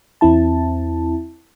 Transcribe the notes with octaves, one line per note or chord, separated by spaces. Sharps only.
E2 C4 E4 A5